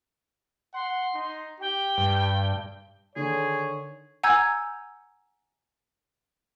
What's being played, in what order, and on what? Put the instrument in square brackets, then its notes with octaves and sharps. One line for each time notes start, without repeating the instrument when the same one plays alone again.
[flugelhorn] F#5 [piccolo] C6
[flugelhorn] D#4
[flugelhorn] G4 [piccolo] G5
[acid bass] G2
[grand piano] D3 D#3 [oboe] G#4 [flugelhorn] C#5
[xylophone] F#5 G#5 A#5 E6 G6 G#6